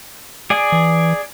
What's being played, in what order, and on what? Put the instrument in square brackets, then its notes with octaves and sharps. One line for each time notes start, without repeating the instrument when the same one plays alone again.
[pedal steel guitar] G#4 D5 G#5
[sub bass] E3